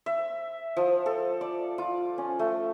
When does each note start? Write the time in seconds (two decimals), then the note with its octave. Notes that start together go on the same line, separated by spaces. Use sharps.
0.06 E5
0.77 F3
1.06 A4
1.41 D5
1.78 F4
2.18 C#4
2.39 A3